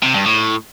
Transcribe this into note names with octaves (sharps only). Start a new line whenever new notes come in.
C3
G2
A2